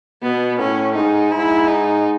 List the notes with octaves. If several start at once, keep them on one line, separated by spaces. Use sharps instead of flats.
B2 B3
A2 C#4
G#2 D#4
G#2 E4
D#4